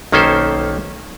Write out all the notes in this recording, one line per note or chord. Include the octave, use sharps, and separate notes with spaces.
B1 D#3 A#3 C#4 A4 C5